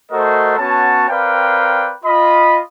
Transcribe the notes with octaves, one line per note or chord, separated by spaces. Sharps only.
A3 F#4 A4 A#4 C5 D#5
B3 C#4 F#4 C#5 A5
C4 A#4 B4 D5 F5 G5
F4 D#5 B5